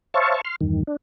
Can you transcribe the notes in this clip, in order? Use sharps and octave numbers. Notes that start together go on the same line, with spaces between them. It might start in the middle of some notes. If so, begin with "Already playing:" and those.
C5 C#5 E5 F5 A5 C#6
C6 F6
E2 G2 D#3
D4